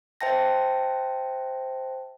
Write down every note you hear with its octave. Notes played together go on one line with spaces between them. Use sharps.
C5 E5 G5 A5 A#6